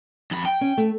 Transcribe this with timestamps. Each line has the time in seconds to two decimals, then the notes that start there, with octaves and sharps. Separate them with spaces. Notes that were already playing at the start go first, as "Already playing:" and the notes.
0.31 F2 B5
0.45 G5
0.61 C#4
0.77 A3